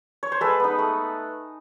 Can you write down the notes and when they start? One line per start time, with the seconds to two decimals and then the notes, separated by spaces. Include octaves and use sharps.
0.23 C#5
0.32 C5
0.41 G#3 A4 B4
0.60 B3 D#4
0.79 A3